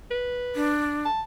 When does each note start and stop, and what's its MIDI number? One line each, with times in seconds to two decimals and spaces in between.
0.11 0.70 71
0.55 1.05 62
1.05 1.22 81